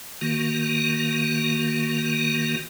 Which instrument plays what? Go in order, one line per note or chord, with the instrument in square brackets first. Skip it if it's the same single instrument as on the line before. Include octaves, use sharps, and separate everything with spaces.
[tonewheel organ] D#3 A#3 F#4